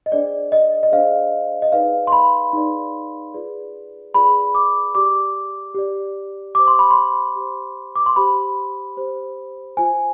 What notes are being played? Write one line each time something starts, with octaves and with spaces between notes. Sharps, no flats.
D#5
D4 G#4 C5 D5
D#5
D#5
D4 G#4 C5 F5
D#5
D#4 G#4 B4 D5 F5
C6
B5
D#4 G#4 B4 D5
F4 G#4 B4 D5
F4 G#4 B4 D5 B5
D6
G4 D5 D6
G4 D5
G4 C5 D6
C6
B5
C6
G4 C5
D6
C6
G4 C5 B5
G4 C5
F4 C5 G#5